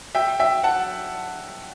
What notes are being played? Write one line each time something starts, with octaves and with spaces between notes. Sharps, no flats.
E5 G5
E5 G5
F#5 A5